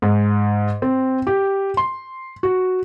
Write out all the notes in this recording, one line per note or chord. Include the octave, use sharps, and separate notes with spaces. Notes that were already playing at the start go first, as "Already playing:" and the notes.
G#2
C4
G4
C6
F#4